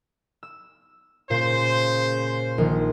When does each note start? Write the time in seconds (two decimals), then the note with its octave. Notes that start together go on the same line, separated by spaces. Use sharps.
0.43 E6
1.30 A#2 C#3 C5
2.58 A#1 D#3